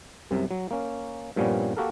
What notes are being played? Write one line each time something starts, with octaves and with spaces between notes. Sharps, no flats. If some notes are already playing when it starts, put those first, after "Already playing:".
C2 F#2 C3
F#3
A#3 C#4
G2 A#2 F3 G3 B3 C#4
A#3 F#4 G4 A4 A#4